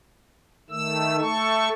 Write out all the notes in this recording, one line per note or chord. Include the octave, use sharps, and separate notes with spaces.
D#3 A3 E6
A3 A4 C#6